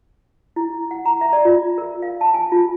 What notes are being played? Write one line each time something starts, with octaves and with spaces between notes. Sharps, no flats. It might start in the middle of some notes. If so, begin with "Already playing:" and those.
E4
F#5
A#5
E5
D5
F4
A#4
F5
A5
G#5
F4